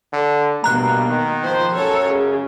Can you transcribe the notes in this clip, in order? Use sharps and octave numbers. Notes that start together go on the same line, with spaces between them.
D3
G2 B2 A#3 A#5 F#6
D#3
F3 C5
F#2 A4 C#5
C#3